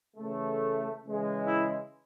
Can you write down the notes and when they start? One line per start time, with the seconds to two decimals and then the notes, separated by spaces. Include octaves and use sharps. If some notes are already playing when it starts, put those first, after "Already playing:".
0.17 C#3 E3 A3
1.03 C#3 E3 G#3
1.46 E4